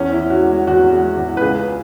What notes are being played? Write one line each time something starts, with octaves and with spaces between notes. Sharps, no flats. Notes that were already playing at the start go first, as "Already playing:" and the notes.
Already playing: E2 C#4
E4
E3
F#4
G#3
E2 F#4
G#3
E2
B4
C#2 G#4